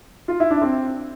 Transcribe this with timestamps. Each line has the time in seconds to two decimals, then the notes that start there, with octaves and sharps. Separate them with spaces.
0.28 F4
0.40 E4
0.51 D4
0.61 C4